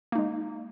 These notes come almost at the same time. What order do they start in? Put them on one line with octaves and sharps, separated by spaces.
A#3 D#4 G#3